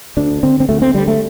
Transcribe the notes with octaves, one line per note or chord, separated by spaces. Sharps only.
D2 D4
D3 C4
C4
D2 A3
C4
D3 G3
A3